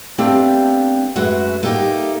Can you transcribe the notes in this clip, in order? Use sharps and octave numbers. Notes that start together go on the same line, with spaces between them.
A3 B3 C4 D4 G4 F5
F#2 G#3 A3 F#4 B4
A3 A#3 D#4 G4